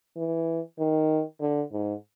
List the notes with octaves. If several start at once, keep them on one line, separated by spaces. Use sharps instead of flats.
E3
D#3
D3
G#2